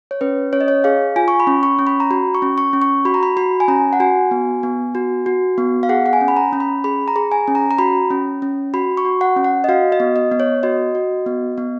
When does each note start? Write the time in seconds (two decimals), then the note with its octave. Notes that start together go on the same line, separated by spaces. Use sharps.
0.11 C#5
0.21 C#4 B4
0.53 C#4 C#5
0.61 D#5
0.68 C#5
0.84 G#4 F5
1.16 F4 G#5
1.28 C#6
1.40 B5
1.47 C#4
1.63 C#6
1.79 C#4
1.87 B5
2.00 A#5
2.11 F#4 B5
2.35 C#6
2.42 C#4
2.58 C#6
2.73 C#4
2.82 C#6
3.05 F#4 B5
3.14 A#5
3.23 B5
3.37 F#4 B5
3.60 G#5
3.68 C#4 A#5
3.93 F#5
4.00 F#4 G#5
4.31 B3
4.63 B3
4.95 F#4
5.26 F#4
5.58 B3
5.83 F5
5.89 G#4 F#5
6.06 F#5
6.13 G#5
6.21 C#4
6.28 B5
6.37 A#5
6.53 C#4
6.60 B5
6.84 G#4 B5
7.08 A#5
7.16 G#4
7.32 G#5
7.48 C#4
7.55 A#5
7.71 A#5
7.79 F#4 B5
8.10 C#4
8.42 C#4
8.74 F#4 B5
8.97 C#6
9.05 F#4
9.21 F#5
9.36 C#4
9.44 F#5
9.64 D#5
9.69 F#4 F5
9.92 D#5
10.00 B3
10.16 D#5
10.32 B3
10.40 C#5
10.63 F#4 D#5
10.95 F#4
11.26 B3
11.58 B3